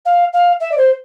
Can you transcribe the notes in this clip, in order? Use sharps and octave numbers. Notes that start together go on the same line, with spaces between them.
F5
F5
E5
D5
C5